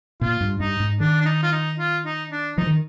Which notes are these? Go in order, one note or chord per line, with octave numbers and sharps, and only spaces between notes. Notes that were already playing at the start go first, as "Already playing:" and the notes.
A#2 F4
G2
G2 D#4
G#2
D#3 D4
D4
D#4
F4
D#4
F4
D#4
D4
F3 D#4
D#3